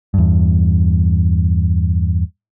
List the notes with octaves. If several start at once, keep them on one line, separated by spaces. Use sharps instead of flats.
E2 G2